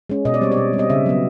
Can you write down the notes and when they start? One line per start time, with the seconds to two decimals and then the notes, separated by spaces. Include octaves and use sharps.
0.10 G#3 C#4
0.25 B2 D#5
0.34 D5
0.41 G3 C4 C#5
0.52 D5
0.57 B2
0.73 G3
0.78 C4 D#5
0.90 C#3 E5
1.06 F#3 B3